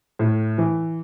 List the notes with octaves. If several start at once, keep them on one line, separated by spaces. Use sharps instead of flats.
A2
E3